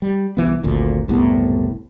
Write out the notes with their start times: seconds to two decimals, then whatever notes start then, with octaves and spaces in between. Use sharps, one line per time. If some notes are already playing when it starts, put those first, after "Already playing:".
0.02 G3
0.37 C2 E3 B3
0.63 G#1 D2 A#2
1.08 F#1 C2 A2 B3